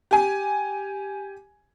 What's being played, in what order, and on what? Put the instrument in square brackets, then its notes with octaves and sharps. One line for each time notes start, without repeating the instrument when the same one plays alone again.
[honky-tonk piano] G4 G#5